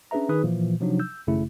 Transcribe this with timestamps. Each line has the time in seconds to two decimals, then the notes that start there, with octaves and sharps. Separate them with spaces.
0.11 C#4 D4 G#4 B4 E5 A#5
0.29 D#3 D#4 G#4 B4 D#6
0.43 A#2 E3 F3
0.80 C3 F3 F#3 D4 D#4
0.99 E6 G6
1.27 G#1 F#2 C#3 A3 E4